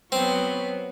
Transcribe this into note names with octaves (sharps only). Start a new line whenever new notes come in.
F#3 B3 C4